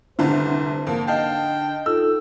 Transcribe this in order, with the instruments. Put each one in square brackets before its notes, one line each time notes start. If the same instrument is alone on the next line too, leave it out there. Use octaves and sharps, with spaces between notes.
[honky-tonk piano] F1 C2 [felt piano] D3 [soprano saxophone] C5
[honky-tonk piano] F2 A#3
[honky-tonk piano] D#4 F5 A5 [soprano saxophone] G5
[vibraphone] D#4 F4 A4 [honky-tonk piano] E6